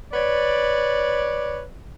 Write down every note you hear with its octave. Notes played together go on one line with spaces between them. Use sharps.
B4 C#5 D5